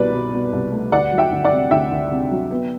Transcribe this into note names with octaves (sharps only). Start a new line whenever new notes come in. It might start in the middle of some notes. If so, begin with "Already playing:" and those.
Already playing: C2 B2 C4 B4 D5
B2
B2
C2
A3
D2 D5 F#5
F#3
E5 G5
D2
D5 F#5
C3
D2 E5 G5
D2
C3
F#3
B3